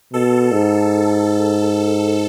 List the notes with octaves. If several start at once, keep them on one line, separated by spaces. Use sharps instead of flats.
B2 A4
G#2